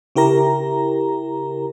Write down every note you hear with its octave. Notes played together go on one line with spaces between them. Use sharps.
C#3 E4 G4 A#4 A#5